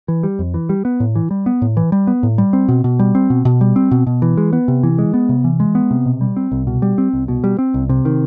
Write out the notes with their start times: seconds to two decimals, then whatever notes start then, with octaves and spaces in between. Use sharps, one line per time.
0.08 E3
0.23 G3
0.39 F2
0.54 E3
0.69 G3
0.85 B3
1.00 A2
1.15 E3
1.31 G3
1.46 B3
1.62 A2
1.77 E3
1.92 G3
2.07 B3
2.23 A2
2.38 G3
2.53 C4
2.68 B2
2.84 B2
2.99 G3
3.15 C4
3.30 B2
3.45 B2
3.61 G3
3.76 C4
3.91 B2
4.07 B2
4.22 E3
4.37 G#3
4.53 B3
4.68 C3
4.83 E3
4.98 G#3
5.14 B3
5.29 C3
5.44 E3
5.60 G#3
5.75 B3
5.91 C3
6.06 B2
6.21 G3
6.36 C4
6.52 C2
6.67 B2
6.82 G3
6.98 C4
7.13 C2
7.28 B2
7.44 G3
7.59 C4
7.74 C2
7.89 C3
8.05 D#3